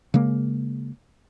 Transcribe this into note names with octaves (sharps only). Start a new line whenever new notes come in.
C#3 G#3 A#3